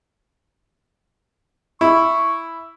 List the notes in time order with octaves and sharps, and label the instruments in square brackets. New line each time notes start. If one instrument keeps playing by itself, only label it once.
[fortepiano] E4 [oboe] C#6